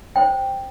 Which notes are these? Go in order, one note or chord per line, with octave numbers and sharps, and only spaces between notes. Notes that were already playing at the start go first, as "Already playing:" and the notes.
C5 G5